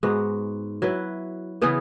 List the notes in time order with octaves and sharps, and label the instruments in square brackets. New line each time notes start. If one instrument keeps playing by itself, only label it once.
[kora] G#2 G#3 B3 F#4
F#3 E4 B4
C#3 E3 B3 G#4